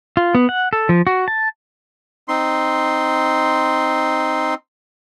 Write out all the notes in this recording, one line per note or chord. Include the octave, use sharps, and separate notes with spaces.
F4
B3
F#5
A4
F3
F#4
A5
C4 D#4 C6